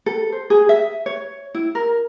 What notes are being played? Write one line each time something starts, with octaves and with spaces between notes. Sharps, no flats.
A4
C5
G#4
E5
C#5
E4
A#4